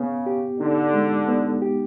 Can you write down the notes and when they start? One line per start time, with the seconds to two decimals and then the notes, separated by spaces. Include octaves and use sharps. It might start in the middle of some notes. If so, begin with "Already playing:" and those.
Already playing: C#3 B3
0.26 G4
0.60 D3 D#4
0.94 G#3
1.28 B3
1.62 G4